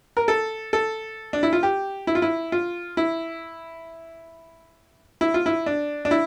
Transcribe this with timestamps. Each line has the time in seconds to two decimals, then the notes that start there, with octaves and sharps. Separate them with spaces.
0.17 A#4
0.28 A4
0.73 A4
1.33 D4
1.43 E4
1.53 F4
1.63 G4
2.07 E4
2.15 F4
2.22 E4
2.52 F4
2.97 E4
5.21 E4
5.34 F4
5.46 E4
5.66 D4
6.05 D4
6.11 E4